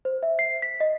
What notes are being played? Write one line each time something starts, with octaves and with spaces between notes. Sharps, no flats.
C5
E5
C7
B6
D#5